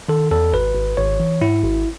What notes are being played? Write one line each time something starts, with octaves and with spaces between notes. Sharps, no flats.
D#3 A4
E2 A4
G#1 B4
G#1
G#1 C#5
E3
G#2 E4
G#1